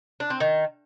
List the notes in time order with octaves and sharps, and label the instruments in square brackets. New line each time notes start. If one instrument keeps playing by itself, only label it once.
[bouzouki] D4
C4
D#3